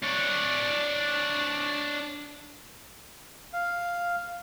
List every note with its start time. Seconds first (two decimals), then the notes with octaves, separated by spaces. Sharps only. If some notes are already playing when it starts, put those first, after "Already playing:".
0.03 D4 C#5
3.53 F5